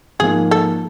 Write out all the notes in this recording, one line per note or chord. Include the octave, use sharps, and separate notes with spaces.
G#2 F3 A#3 G#4
A4